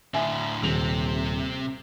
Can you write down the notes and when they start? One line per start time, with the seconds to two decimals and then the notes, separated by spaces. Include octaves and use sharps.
0.14 A2 D3 E5 G#5
0.63 D#1 C3 F7